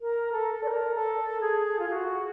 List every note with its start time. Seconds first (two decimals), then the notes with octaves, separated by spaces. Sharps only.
0.01 A#4
0.32 A4
0.54 A4
0.63 D5
0.67 A#4
0.94 A4
1.41 G#4
1.79 F4
1.88 G#4
1.91 F#4